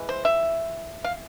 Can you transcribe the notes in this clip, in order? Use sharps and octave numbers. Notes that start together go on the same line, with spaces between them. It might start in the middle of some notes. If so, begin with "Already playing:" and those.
Already playing: E3 G#3
C5
E5
F5